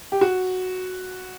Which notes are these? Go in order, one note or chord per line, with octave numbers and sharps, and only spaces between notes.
G4
F#4